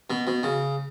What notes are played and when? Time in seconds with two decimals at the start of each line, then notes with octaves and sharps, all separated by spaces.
0.10 B2
0.27 B2
0.43 C#3